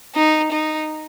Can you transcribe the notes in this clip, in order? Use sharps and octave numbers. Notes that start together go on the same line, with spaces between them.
D#4
D#4